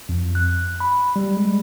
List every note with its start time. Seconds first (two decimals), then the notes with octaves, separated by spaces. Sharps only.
0.09 F2
0.35 F#6
0.80 B5
1.16 G3
1.37 G#3